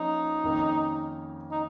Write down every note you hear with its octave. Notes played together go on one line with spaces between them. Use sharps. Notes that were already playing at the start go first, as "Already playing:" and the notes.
Already playing: F3 A#3 C#4 D#4
F2 D#3 A#3 C#4
D#4